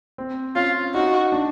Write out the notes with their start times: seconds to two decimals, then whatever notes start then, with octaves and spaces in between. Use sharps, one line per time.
0.18 C4
0.56 C#4 F4
0.94 D#4 F#4
1.32 D4